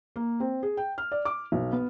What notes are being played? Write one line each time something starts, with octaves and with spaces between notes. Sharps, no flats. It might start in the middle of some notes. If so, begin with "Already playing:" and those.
A#3
C4
G#4
G5
F6
D5
D6
B1
B3